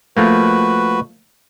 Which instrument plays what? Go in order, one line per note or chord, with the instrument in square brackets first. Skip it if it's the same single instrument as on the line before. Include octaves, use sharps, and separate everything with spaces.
[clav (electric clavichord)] F3 A3 A#3 [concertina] F#4 B4